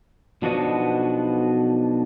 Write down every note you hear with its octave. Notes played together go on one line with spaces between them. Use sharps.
B1 B2 F3 D4 F#4 D#5